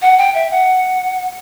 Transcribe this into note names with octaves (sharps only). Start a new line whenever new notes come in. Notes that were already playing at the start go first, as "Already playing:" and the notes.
F#5
G5
E5
F#5